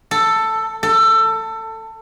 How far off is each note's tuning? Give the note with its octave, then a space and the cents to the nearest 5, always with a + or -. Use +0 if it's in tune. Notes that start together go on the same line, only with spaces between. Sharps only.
A4 +10
A4 +20